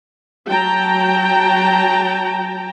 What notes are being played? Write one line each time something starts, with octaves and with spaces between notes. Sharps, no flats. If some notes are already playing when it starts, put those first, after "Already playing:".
F#3 G5 A5 A#5